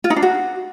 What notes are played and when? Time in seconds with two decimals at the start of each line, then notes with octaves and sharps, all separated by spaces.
0.04 F4
0.10 D#4
0.16 D4
0.23 F#4